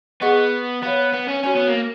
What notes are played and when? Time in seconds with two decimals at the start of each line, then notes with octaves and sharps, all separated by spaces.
0.22 B3 G#4 D#5 F#5 C#6
0.83 B3 C#5 F5 B5
1.13 B3
1.28 C#4
1.43 C#4 F#4 C#5 G#5
1.56 B3
1.68 A#3